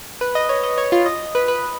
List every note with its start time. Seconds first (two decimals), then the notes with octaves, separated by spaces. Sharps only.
0.21 B4
0.35 D#5
0.49 C#5
0.64 D#5
0.78 C#5
0.92 F4
1.06 D#5
1.35 B4
1.48 B4